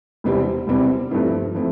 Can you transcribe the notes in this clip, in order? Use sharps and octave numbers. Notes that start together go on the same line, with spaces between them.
E1 E2 C3 G3 C4
E1 E2 C3 G3 C4
G2 F3 A3 C4 E4
F3 A3 C4 E4